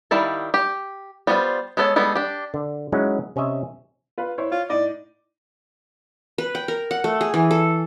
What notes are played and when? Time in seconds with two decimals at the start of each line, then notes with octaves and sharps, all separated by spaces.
0.11 D#3 G3 E4 F5 A5
0.54 G4
1.27 G3 B3 F4 G#4 C5
1.77 G#3 B3 A4 B4 C#5
1.96 G3 G#3 B3 A4
2.15 D4 G4
2.54 D3
2.92 F#3 G#3 C#4 D#4 E4 F#4
3.36 C3 C#4 C#5 D#5 E5
4.18 F4 B4
4.38 E4 C5 C#5
4.51 F4 C#5
4.70 A2 D#4 D5 D#5
6.38 B4
6.55 G5
6.68 A#4
6.91 F#5
7.04 A3
7.21 G#4
7.34 E3
7.51 A4